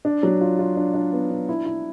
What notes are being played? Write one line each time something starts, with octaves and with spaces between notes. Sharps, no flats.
D4
F#3
F4
F4
D4
D4
B3
D4
E4
E4